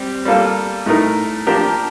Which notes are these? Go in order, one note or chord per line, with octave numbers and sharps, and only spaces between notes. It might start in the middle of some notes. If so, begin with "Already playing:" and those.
Already playing: G3 C4 G4
G3 A#3 F4 A4
A2 A3 D#4 A#4
F3 A#3 D4 G4 A#4